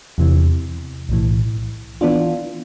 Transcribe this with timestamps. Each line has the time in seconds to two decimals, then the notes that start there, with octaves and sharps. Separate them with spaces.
0.18 E2 C3 E3
1.09 B1 A2 E3
2.01 E3 B3 D4 F4